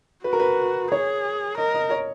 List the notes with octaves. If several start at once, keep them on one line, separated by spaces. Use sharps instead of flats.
F#4 B4
A#4
B4
G#4 C#5
A#4 D#5
D#5
C#5